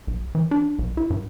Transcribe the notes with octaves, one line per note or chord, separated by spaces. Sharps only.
B1
E3
D4
B1
E4
G2